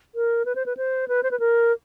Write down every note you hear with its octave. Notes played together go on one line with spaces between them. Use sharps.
A#4
B4
C5
B4
C5
B4
C5
B4
A#4